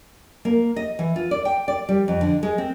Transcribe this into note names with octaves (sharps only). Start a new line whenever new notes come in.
A#3
D#5
E3
F4
D5
G5
D5
G3
F2
D3
G#3
C4